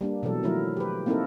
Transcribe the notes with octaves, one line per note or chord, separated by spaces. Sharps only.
G3 A#3 D4
B2 E3 F#3 A4
D#3 F3 F#3 A3 E4 A#4
G4 B4
A#3 C4 D#4 E4 A4 A#4